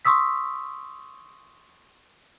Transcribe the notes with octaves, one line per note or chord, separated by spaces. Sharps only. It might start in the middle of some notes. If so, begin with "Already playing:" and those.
C6 C#6 D#6 E6 B6